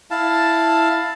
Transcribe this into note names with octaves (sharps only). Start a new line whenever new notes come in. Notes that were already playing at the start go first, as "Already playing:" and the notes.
E4 F5 A5